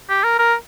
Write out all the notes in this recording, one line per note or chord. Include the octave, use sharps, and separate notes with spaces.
G4
A#4
A#4